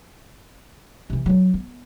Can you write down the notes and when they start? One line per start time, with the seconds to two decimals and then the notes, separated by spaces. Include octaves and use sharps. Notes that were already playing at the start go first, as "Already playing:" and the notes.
1.10 C3 E3
1.26 F#3 C4
1.54 B3